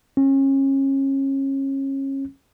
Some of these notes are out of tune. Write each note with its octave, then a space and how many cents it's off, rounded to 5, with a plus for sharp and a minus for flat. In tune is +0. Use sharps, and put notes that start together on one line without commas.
C#4 -30